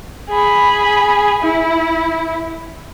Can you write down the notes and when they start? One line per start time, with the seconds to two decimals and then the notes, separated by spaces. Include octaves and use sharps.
0.30 G#4 B5
1.42 E4